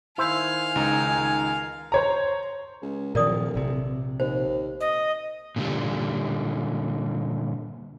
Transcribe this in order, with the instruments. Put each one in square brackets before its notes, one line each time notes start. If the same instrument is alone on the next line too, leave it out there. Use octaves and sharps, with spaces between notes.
[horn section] D#3 G#5 [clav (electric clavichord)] E4 C5 [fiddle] F5
[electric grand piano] C#2 D#4
[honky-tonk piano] C5 C#5 A#5
[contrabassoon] C#2
[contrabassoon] D1 [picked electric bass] A#2 D#3 F3 [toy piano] A#4 D5 D#6
[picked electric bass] A#1 C3
[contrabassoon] D#2 [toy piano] C5
[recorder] D#5
[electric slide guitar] A#2 D3 G3